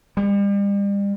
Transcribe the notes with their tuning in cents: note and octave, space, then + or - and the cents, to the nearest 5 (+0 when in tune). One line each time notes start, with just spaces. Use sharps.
G3 +40